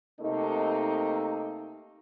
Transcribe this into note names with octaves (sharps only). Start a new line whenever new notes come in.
C3 A3 A#3 D#4